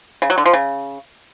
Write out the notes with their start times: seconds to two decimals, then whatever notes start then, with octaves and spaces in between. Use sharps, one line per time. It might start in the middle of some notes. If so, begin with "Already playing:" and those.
0.22 C#3
0.30 F#3
0.38 D3
0.46 F3
0.53 C#3